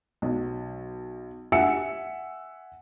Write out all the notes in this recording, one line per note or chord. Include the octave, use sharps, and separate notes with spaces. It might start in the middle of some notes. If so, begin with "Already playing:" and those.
B1
E5 F#5 G#5 E6 C#7